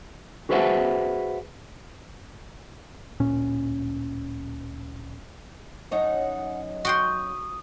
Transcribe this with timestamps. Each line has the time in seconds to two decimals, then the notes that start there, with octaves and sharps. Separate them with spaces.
0.49 F#4 G#4 B4 C5 E5 F#5
3.20 D1 A#2 C#4
5.92 F#2 D#4 C#5 F#5
6.85 F#4 G5 C6 D#6